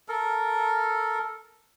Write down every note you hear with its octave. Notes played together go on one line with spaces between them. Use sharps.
A4 A#4